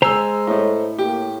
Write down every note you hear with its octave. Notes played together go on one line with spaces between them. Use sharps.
G#3 C5 G#5 A#5 E6
A2 A3 D#5
A#3 G4